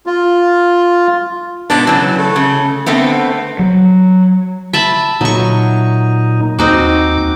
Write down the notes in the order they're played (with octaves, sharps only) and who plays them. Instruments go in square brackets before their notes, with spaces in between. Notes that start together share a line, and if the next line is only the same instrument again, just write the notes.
[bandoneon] F4
[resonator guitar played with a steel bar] G#2 B2 B3 [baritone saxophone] D4
[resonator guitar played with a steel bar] C#3 F#3 [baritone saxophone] E3
[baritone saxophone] A3
[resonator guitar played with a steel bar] C#3
[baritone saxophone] D3 [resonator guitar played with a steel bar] A3 B3 C4
[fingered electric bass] F#3
[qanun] E5 A5 B5
[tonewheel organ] A#2 D#4 [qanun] F#3 C#6
[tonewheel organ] D#2 D6 [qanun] C4 D#4 F#4